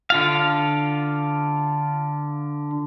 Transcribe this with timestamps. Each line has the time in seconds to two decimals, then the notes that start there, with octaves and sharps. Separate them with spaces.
0.10 D3 F4 F5